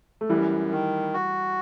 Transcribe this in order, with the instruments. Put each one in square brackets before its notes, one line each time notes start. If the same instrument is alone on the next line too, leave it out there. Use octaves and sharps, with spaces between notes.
[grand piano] A3
[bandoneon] F#2 [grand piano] E3 G3
[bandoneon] D#3
F#4